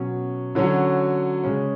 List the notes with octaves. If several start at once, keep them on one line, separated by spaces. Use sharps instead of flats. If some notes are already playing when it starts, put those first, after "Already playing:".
Already playing: B2 F#3 C#4 F#4
D3 F#3 C#4 F#4
C#3 G#3 C#4